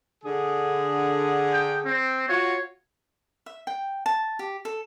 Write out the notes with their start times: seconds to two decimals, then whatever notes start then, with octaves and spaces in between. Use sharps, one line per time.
0.24 D3 G#4
1.53 G5
1.85 C4
2.29 F4 F#4 C#5
3.46 E5
3.67 G5
4.06 A5
4.39 G4
4.65 A4